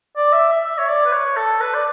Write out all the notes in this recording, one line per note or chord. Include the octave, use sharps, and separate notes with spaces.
D5
E5
E5
E5
C#5
D5
B4
C#5
A4
B4
D5